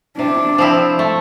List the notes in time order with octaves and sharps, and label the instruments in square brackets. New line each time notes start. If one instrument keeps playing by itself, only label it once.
[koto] C3 [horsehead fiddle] D4
[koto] F3 C4 E4
A3